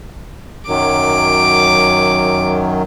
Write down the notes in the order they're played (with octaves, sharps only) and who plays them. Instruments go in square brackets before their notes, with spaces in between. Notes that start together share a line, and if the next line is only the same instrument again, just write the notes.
[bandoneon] F#2 D#3 F#3 [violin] D6